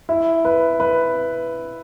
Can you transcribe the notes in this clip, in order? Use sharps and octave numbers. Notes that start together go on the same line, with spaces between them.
E4
B4
B4